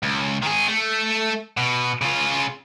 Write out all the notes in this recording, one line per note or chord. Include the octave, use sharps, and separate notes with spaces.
C#2
D#3 G#4
A3
B2
C#3 F4